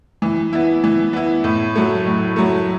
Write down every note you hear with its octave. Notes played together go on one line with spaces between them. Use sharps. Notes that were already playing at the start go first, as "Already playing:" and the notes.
E3
B3 E4
E3
B3 E4
A2
F#3 A3
A2
F#3 A3